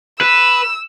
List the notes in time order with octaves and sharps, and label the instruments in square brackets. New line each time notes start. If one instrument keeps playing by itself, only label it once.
[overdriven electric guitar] B4 [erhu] E6